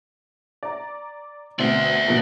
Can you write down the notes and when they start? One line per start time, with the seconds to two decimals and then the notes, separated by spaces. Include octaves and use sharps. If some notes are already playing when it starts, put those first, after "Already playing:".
0.63 D5 A#5
1.59 D2 B2 C4 D5 E5
2.07 B2 F3 A#3